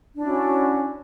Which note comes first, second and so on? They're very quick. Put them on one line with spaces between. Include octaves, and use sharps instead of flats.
D4 E4 C#4 F#4